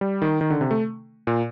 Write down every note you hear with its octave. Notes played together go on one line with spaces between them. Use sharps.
G3
D#3
D#3
D3
C3
A3
A#2